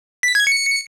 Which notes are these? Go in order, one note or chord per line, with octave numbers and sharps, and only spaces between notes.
B6
G#6
C#7